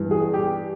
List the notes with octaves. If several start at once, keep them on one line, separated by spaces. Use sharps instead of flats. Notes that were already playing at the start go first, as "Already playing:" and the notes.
Already playing: G2 E3
G#4
G4